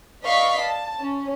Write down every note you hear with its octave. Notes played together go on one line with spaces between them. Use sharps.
B4 D5 D#5 F5 C#6 B6
A5
C#4